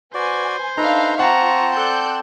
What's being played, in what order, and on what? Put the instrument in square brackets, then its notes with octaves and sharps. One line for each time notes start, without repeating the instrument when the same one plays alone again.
[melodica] F#4 D5 [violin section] B4 G#5 G#6 [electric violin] C5
[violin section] D4 E5 F5 [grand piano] D#4 [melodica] A4 B4 A#5
[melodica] C4 C5 A5 [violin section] F4 [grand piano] F#5 [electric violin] A#5 C#6
[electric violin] A4 D5 [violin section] F#6 G6